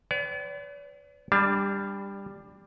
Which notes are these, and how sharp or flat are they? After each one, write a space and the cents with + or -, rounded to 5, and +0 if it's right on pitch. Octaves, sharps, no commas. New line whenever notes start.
B4 +40 D5 -45 G5 -35
G3 +15 D4 +0 A5 -25